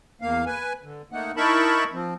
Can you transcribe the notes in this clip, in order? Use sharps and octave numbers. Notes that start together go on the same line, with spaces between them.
E2 A#3 F5
B4 G#5
D3
A3 A#3 D#4 F#5
D#4 E4 A#4 A5 B5 C#6
F3 C4